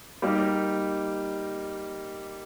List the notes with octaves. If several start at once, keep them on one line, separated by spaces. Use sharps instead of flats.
G3 A#3 D#4 G4